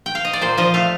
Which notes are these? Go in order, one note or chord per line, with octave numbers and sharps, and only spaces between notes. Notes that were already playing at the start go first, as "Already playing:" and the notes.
G5
F5
D#5
D5
A#2 C5
F3 D#5
A3 F5